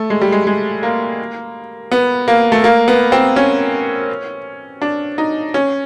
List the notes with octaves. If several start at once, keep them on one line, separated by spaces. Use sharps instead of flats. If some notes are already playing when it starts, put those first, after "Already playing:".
Already playing: A3
G#3
G3
G#3
G#3
A#3
B3
A#3
A3
A#3
B3
C4
C#4
D4
D#4
C#4